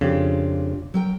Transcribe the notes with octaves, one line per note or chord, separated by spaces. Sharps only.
F2 C#3 D4 F4 G4
F#3 A#4 G5